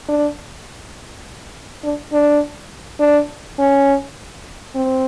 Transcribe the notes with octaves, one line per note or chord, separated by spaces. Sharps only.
D4
D4
D4
D4
C#4
C4